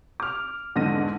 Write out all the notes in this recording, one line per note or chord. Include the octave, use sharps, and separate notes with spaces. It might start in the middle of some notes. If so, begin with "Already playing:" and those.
D6 F6
E2 G#2 D3 A#6 D#7